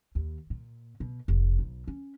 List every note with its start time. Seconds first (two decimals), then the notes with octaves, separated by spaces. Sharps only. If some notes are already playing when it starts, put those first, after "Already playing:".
0.15 D#2
0.50 A#2
1.00 B2
1.28 F1
1.59 B1
1.88 C#4